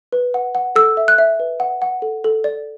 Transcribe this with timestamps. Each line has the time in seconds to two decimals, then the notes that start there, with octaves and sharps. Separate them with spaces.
0.12 B4
0.34 F#5
0.55 F#5
0.76 A4 E6
0.97 E5
1.08 F#6
1.18 E5
1.40 B4
1.60 F#5
1.82 F#5
2.02 A4
2.24 A4
2.44 D5